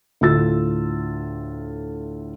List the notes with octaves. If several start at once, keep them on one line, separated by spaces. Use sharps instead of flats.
D2 A2 F4 E6 A6